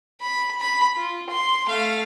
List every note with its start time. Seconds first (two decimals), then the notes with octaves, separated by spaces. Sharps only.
0.21 B5
0.60 B5
0.97 F4
1.30 C6
1.68 A3 F5